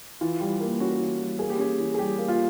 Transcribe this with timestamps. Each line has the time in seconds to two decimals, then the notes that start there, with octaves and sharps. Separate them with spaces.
0.21 E3 F4
0.41 G3
0.61 A#3
0.80 C#4 F#4
1.00 E3
1.20 G3
1.39 A#3 G#4
1.50 G4
1.58 C#4 G#4
1.79 E3
1.94 G#4
1.99 G3 G4
2.18 A#3
2.28 F4